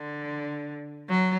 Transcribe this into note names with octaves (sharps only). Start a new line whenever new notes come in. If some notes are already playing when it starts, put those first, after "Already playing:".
Already playing: D3
F#3